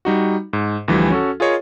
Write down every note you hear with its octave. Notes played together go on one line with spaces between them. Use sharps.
G3 D#4 F#4
G#2
D2 E3 F3 G3
C#4 F#4 A4
F4 G#4 A#4 C#5 D#5